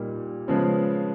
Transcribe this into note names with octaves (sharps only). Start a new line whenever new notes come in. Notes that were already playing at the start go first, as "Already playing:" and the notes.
Already playing: A#2 G3 A#3 D#4
C#3 F3 G#3 B3